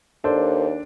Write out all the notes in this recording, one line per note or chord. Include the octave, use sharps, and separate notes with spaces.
D#2 D4 A4 C5